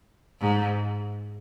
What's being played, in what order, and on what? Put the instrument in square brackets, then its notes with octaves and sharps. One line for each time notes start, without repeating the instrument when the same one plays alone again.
[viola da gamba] G#2